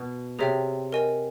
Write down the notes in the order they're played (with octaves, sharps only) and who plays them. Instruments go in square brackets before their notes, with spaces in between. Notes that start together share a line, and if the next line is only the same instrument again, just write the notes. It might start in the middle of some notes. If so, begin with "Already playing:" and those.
Already playing: [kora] B2
[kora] C3 [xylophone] G#4 C#5 E5 G5
[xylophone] A#4 D#5 G#5